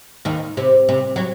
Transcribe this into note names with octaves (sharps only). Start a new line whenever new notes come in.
D#2 D#3
C3
C3
F#3